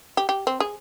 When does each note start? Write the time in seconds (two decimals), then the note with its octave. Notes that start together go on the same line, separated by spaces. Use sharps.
0.17 G4
0.29 G4
0.47 C4
0.60 G#4